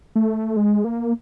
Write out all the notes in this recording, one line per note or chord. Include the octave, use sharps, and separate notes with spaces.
A3
G#3
A#3